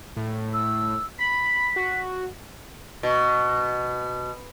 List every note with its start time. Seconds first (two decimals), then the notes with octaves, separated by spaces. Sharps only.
0.16 A2
0.54 E6
1.19 B5 B6
1.76 F#4
3.03 B2